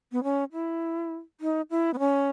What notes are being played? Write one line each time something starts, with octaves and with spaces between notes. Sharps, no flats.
B3
C#4
E4
D#4
E4
B3
C#4